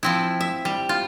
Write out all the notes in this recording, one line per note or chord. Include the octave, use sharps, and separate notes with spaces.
F3 C4 E4
E5
G3
F4